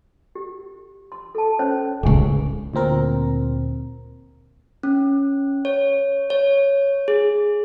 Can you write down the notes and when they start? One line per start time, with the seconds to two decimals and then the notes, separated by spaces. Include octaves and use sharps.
0.35 G4
1.12 C6
1.35 A4 A5
1.59 C#4 C5 C#5
2.03 D1 C#2 G#4 G#5 C#6
2.74 D2 A#2 C4 A#4
4.83 C#4
5.65 C#5
6.30 C#5
7.08 G#4